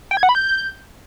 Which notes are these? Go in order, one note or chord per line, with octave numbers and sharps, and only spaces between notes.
G5
G#6
F#5
B5
G6